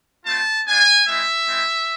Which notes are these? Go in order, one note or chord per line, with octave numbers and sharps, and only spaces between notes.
A3 C4 F4 A5
B3 D4 F4 G#5
G#3 C4 E4 E5
G#3 C4 E4